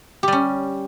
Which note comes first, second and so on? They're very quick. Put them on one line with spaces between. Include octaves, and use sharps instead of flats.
G4 G3 C#4